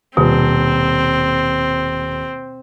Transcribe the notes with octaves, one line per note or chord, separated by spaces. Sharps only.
D#1 B2 C4